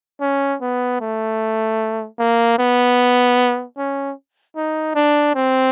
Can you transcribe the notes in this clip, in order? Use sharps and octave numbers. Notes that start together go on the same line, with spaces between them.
C#4
B3
A3
A#3
B3
C#4
D#4
D4
C4